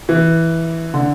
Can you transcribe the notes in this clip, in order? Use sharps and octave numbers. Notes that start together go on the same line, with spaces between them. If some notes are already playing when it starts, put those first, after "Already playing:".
E3
D3